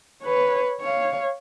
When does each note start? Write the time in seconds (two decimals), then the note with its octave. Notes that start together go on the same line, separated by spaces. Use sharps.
0.24 B4 C#5
0.81 C#5 F5